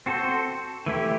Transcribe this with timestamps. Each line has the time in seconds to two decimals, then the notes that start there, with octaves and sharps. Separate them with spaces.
0.06 C4 F#4 A4 C5
0.86 E3 A3 E4 G4